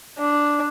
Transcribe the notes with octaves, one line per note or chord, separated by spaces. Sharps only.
D4